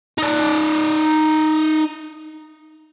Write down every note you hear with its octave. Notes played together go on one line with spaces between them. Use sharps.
D#4 D5